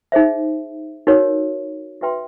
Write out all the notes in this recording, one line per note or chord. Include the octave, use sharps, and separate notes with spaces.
D#4 G#4 C5 E5
D#4 F#4 A#4 C#5
F#4 B4 E5 G5 C6